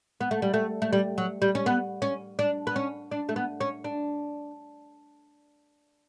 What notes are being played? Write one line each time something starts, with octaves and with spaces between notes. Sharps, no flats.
B3
A3
G3
A3
A3
G3
F#3
G3
C#4
B3
C#4
D4
B3
C#4
D4
A3
B3
C#4
D4